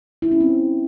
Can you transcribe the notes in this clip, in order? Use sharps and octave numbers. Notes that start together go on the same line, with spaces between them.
E4
C#4
C4